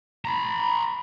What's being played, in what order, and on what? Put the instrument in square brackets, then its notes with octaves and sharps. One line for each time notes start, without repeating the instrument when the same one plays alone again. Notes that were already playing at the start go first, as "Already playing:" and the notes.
[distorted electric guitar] A#5 B5